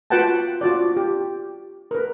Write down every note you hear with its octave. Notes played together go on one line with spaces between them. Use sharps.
F4 F#4 B4 F#5 G5 A5
F4 F#4 D5
G4
A#4 B4